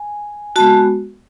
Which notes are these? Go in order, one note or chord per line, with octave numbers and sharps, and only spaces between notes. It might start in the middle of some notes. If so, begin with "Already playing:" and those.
Already playing: G#5
G#3 B3 F#4 A5